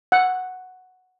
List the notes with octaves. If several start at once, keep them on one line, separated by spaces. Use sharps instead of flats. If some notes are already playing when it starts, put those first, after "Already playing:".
F#5